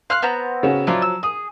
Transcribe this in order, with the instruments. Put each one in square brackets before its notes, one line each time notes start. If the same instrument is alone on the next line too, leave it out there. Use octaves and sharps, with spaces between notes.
[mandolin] F5 F6 F#6 [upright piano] C6
[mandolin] B3 C4 A#5
[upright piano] C#3 C#4 F#4
[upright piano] F3 F#3 [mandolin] E4 F4 D5
[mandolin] E6
[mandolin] G#4 [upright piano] D#6